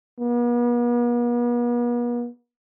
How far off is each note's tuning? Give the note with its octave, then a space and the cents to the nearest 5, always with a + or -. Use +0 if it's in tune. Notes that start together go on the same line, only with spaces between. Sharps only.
B3 -45